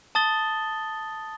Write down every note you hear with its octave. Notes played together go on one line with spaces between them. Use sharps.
A5 D#6 A6 G7